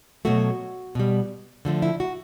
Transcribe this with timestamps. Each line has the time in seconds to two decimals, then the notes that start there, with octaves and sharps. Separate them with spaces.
0.25 B2 F#3 A3 F#4
0.95 B2 G3
1.65 D3 F3 A3
1.82 E4
2.00 F#4